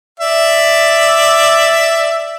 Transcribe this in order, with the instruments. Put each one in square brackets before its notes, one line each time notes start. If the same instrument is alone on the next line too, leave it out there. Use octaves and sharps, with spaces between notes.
[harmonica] D5 E5